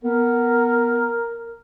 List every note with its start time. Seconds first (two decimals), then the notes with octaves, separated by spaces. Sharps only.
0.03 B3 A#4